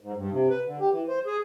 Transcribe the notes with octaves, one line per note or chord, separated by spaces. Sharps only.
G#2
G2
C3
B4
D3
G4
E3
C5
G#4